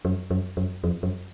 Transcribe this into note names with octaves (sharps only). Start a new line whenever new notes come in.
F#2
F#2
F#2
F2
F#2